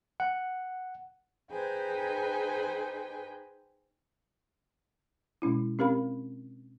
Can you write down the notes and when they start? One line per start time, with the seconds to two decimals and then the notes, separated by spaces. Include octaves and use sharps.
0.20 F#5
1.50 D#4 G#4 B4 C5 G5 G#5
5.42 B2 G#3 C#4 E4
5.79 C4 C#4 G4 A#4 F5 B5